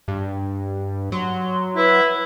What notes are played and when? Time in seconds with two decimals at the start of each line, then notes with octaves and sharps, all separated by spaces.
0.08 G2
1.12 F#3 C6
1.76 E4 B4